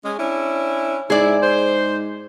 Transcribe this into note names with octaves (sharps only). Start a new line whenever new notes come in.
G#3 C#4
C#4 D4 E4
G#2 E4 G#4 D5
C5